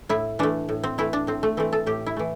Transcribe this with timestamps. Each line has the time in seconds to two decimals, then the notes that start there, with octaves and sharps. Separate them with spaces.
0.09 A2 E4
0.39 E3 A3 D4
0.69 A2
0.84 C4
0.98 E3 A3 E4
1.13 D4
1.27 A2 C4
1.43 A3
1.57 E3 A3 C4
1.73 A4
1.86 A2 G4
2.06 E4
2.17 E3 A3